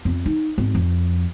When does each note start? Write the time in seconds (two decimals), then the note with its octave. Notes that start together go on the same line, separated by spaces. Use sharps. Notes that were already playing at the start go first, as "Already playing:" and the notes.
0.05 F2
0.26 D#4
0.58 G#1
0.75 F2